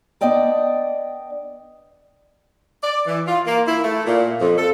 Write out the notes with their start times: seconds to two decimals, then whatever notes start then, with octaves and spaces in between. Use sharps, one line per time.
0.21 B3 D4 D5 D#5 G5 A5
2.83 D5
3.06 E3
3.28 F4
3.46 A#3
3.67 E4
3.83 A3
4.06 A#2
4.40 F2
4.58 A4